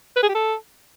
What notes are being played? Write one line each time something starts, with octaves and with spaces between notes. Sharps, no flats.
B4
G#4
G4
A4